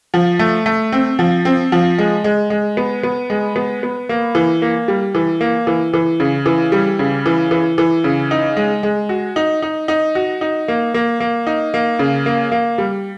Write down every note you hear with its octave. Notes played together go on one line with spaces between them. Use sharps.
F3
A3
A3
C4
F3
C4
F3
G#3
G#3
G#3
B3
B3
G#3
B3
B3
A#3
E3
A#3
G3
E3
A#3
E3
E3
C#3
E3
G3
C#3
E3
E3
E3
C#3
D#4
G#3
G#3
F#4
D#4
D#4
D#4
F#4
D#4
A#3
A#3
A#3
D#4
A#3
C#3
A#3
A#3
G3